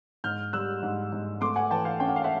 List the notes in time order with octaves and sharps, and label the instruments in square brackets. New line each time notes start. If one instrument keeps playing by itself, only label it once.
[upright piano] G#2 F6 G6
G3 E6 F#6
G#2
G#2
A3 C6 D6
F#5 G#5
E3 G5 A5
F5 G5
C#4 G5
F#5
F5
E5 F#5